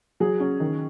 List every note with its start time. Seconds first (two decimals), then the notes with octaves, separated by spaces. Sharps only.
0.20 F#3 G#4
0.40 C#4
0.60 D#3